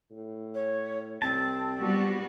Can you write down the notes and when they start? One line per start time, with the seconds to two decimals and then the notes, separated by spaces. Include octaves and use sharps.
0.11 A2
0.55 C#5
1.22 C2 C4 A5
1.80 A#1 G3 B3 F#4